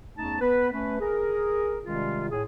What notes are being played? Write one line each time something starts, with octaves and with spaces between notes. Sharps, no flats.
E2 A3 C#4 D#4 A5
B3 B4
A3 C#4 B4
G#4 A#4
C3 D#3 G3 G#3 C#4 F4
A2 G#4